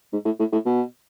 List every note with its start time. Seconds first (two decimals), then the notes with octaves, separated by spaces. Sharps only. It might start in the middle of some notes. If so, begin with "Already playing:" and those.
0.13 G#2
0.25 A2
0.39 A2
0.52 A2
0.66 B2